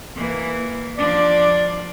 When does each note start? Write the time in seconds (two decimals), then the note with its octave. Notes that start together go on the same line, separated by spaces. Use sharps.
0.16 E3 A#3
0.98 F3 D4 D5